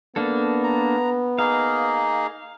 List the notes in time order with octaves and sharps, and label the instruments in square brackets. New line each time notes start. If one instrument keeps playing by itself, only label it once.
[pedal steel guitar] A#3 D4 A4 [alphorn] B3
[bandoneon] A#5
[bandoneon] A#3 D#4 G#4 [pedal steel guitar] F5